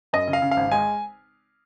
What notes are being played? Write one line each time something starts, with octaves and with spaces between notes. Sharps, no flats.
F#2 D#5
C#3
F5
C#3
F5
G#1
G#3 G#5